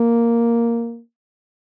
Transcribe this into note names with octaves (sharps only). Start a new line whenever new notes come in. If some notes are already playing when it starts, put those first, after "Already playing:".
Already playing: A#3